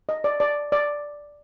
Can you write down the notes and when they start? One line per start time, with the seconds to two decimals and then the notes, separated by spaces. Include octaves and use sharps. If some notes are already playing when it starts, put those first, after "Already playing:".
0.09 D#5
0.24 D5
0.40 D5
0.72 D5